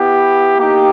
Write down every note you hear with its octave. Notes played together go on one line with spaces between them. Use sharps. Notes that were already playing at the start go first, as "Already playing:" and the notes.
Already playing: B3 E4 G4
A#3 D#4 G4